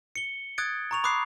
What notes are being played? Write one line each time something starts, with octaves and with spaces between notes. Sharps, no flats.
C#7 G7
D#6 F#6 G#6 A6 D7
A#5 C#6 F7
B5 D6 D#6 F#6 C7